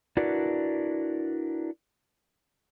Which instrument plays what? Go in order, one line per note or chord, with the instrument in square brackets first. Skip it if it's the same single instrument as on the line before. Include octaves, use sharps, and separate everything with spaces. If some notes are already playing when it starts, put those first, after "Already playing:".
[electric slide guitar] D4 E4 F#4 A#4 B4 D5